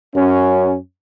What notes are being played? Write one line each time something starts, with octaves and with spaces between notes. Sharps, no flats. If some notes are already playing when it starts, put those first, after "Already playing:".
F#2 C#4